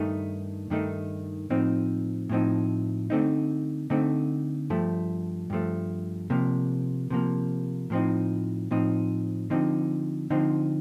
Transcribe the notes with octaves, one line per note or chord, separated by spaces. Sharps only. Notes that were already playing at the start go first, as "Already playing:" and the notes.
Already playing: G2 D#3 A3 D#4
G2 D#3 A3 D#4
A2 F3 C4 D#4
A2 F3 C4 D#4
D3 A3 C4 D#4
D3 A3 C4 D#4
G2 F3 A3
G2 F3 A3
C3 F3 A#3
C3 F3 A#3
A2 F3 C4 D#4
A2 F3 C4 D#4
D3 F3 C4 D#4
D3 F3 C4 D#4